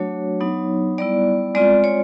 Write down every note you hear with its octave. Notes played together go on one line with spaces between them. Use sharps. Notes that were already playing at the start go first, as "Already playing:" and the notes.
Already playing: F#3 A3 D4 F#4 C#5
F#3 B3 D#4
G3 B3 E4 D5
G#3 C4 F4 D5
C#5